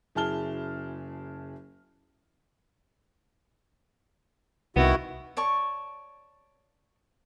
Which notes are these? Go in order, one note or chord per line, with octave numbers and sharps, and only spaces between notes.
F#1 E4 G#4 A5 F6 G7
C2 D#3 B3 E4 F#4
C#5 D5 A5 C#6